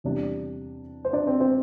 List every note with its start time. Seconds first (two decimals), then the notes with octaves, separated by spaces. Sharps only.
0.04 E2 C3 G3 D4
1.05 C5
1.13 D4 D5
1.27 C4 C5
1.40 C4 C5